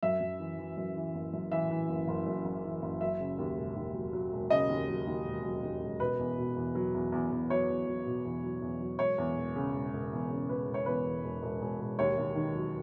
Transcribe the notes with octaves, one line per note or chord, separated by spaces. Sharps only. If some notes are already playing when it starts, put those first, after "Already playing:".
F#2 E5
F#2
E3
E3
F#2
E3
F#1
F#2
E3 E5
E3
F#1
F#1
F#2
F#1
E3
F#1
F#3 E5
C#3
D#2
E1
D#2
F#3
F#3
E1
C#3 D#5
D#2
F#3
D#2
E1
F#3
D#2
E1
B2 B4
E2
B2
E2
F#3
E2
E2
E2
F#3 C#5
E2
F#3
B2
E2
F#3
E2
F#3
E1 C#5
E2
E1
C#3
E1
E1
E2
C#3
E1 B4
E1
C#5
E2 B4
E2
E1
E1
E1
E1
D#2 C#5
D#2
D#3
F#3